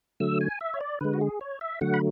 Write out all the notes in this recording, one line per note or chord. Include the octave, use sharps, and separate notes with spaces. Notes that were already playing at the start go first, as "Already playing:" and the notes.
D3 F#3 A3 E6
G#5
E5
C#5
D5
D3 G#3 B4
F#4
G#4
C#5
E5
D3 F#3 A3 F#5
B5